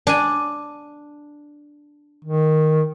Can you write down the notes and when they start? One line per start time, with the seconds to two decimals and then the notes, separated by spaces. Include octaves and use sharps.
0.07 D4 G#5
2.25 D#3